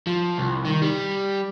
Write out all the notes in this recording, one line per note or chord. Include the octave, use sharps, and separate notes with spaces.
F3
C2
D#3
G3